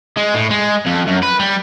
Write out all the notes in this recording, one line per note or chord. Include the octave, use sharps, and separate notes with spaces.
G#3
A2
G#3
F2
F#2
B4
G3